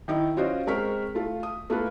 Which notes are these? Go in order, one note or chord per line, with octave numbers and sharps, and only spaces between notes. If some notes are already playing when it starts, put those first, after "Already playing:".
D#3 D#4 E4
C#4 F4 F#4 C5 D5 D#5
G#3 C4 A#4 C#6 F6 B6
A3 F4
D#6
A3 A#3 F4 B4